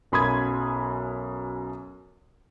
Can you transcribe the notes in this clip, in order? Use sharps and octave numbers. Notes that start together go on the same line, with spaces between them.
B1 F#2 B5 C6 D#6 G#6